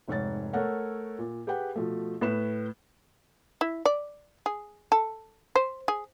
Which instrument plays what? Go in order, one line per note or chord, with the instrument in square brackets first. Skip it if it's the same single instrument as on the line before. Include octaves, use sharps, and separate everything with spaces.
[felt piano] F1 G#2 C#5 A6
A3 A4 A#4 C#5 F#5
A#2
G4 G#4 B4 F#5 G5
B2 F3 A3
A2 B4 E7
[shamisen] E4
D5
G#4
A4
C5
G#4